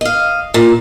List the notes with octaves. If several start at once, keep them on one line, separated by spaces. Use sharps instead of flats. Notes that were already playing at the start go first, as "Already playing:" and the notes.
D#5 F5
A#2